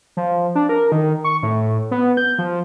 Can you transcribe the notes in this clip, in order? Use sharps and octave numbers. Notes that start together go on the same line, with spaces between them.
F3
D4
A#4
D#3
C#6
A2
B3
G6
F3